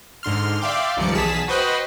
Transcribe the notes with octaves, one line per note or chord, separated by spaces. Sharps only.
G#2 D3 C6 F6
D5 E5 F5 G5 C6 D6
C#2 G2 D#3 F3 D5 C#7
B1 E2 G#4 A5 B6 E7
F#4 B4 C5 D#5 F#5 G5